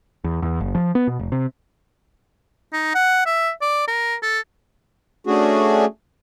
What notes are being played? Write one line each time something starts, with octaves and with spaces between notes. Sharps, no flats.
E2
E2
F#1
F3
B3
B2
F1
C3
D#4
F#5
E5
D5
A#4
A4
A3 C#4 D4 F#4 G#4